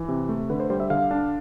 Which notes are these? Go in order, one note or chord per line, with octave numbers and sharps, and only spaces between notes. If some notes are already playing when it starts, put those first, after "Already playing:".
Already playing: E3
C3
A3
D3 B4
C5
G3 C5
E5
D3 F5
D4